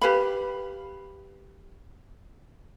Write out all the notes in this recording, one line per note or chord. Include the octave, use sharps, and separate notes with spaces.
G4 B4 F5 B5